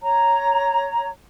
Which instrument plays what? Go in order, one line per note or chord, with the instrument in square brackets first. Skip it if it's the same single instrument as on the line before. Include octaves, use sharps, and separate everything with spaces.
[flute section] C#5 A#5